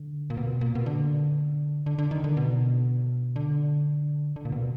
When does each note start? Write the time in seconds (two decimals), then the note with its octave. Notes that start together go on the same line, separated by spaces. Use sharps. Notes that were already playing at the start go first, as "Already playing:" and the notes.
Already playing: D3
0.30 A#2
0.37 B2
0.61 A#2
0.75 B2
0.86 D3
1.86 D3
1.98 D3
2.11 D#3
2.24 D3
2.37 B2
3.36 D3
4.36 D3
4.45 A#2
4.52 B2